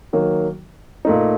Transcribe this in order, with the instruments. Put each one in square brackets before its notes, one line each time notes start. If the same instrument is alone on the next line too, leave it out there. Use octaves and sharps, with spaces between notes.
[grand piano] D#3 F#3 A#3
A#2 A3 D#4